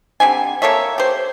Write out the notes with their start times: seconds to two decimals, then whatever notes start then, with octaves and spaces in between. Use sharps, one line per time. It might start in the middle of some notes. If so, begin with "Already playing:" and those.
0.20 D3 G3 C4 G#5
0.62 A#3 A4 C#5 E5
0.98 G4 C5